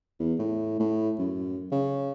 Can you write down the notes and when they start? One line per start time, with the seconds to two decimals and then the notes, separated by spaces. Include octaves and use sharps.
0.19 E2
0.39 A2
0.79 A2
1.18 F#2
1.72 C#3